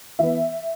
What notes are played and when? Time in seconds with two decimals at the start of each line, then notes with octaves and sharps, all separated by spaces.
0.19 E3 B3 E5